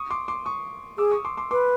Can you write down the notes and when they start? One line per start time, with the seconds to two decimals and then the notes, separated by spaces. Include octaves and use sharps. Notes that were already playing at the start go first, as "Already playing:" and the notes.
Already playing: C#6 D#6
0.10 C6 D6
0.28 C6 D6
0.45 C#6 D#6
0.98 G#4 D6 E6
1.11 C#6 D#6
1.25 C6 D6
1.37 C6 D6
1.51 B4 C6 D6